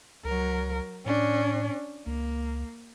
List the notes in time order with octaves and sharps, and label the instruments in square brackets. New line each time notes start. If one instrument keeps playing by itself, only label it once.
[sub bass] C#2 [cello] F#3 A#4
[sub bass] A2 [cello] C#4 D4
[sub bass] C#2 [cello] A#3